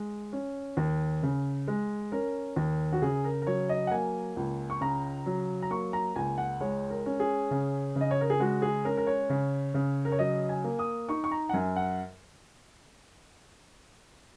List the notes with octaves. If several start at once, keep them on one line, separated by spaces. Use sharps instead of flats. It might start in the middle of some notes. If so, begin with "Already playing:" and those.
Already playing: G#3
C#4
D#2
C#3
G#3
C#4 A#4
D#2
F#4
C#3 G#4
A#4
A#4
F#3 C#5
D#5
F#5
A#3 G#5
C#2
C#6
C#3 A#5
F#3
A#5
A#3 C#6
A#5
C#2 G#5
F#5
G#3 C#5
A#4
C#4
G#4
C#3
C#3
D#5
C#5
A#4
G#4
G#3 F#4
G#4
C#4 A#4
A#4
C#5
C#3
C#3
A#4
C#5
F#3 D#5
G#5
A#3
D#6
D#4 C#6
C#6
A#5
F#5
F#2 G#5
F#5